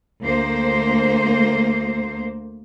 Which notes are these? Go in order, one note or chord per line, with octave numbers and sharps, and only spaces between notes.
D2 A#3 C5